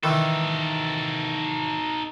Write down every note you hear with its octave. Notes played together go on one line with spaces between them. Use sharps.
D#3 E3 D#4 A4